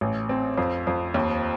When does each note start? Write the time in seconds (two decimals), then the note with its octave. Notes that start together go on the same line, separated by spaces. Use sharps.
0.01 A1
0.29 C4
0.58 F2
0.87 F2
1.14 D#2